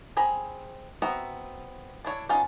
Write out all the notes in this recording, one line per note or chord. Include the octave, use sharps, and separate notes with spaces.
C4 G#4 A#5 B5
B3 C4 F#4 E5 A#5
D4 E4 C#5
B3 C#4 D#4 F4